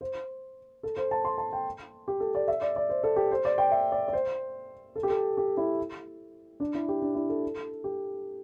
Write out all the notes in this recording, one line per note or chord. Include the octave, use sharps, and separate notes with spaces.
C5
A4
C5
A5
C6
A5
G5
G4
A4
D5
E5
D5
D5
C5
A4
G4
C5
D5
G5
E5
D5
D5
C5
A4
G4
A4
G4
E4
D4
E4
G4
D4
E4
A4
G4